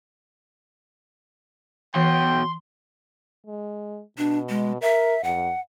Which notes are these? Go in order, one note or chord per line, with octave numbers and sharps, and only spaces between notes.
E3 B3 F#4 C#5 G5 C6
G#3
B2 D4
G#3
A#4 E5
F2 F#5